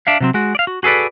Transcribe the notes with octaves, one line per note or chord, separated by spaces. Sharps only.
D4 E5 F5
C3 F#3 C4
G#3 F#4
D5 F5
F#4
F#4 G#4 A4 B4 D5